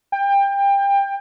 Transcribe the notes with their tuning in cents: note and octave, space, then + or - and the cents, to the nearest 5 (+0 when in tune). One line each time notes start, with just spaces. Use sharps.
G5 +25